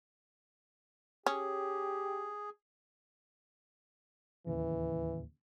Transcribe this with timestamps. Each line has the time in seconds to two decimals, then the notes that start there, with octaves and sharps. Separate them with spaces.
1.26 C#4 G4 G#4
4.47 D1 D#2 C#3 E3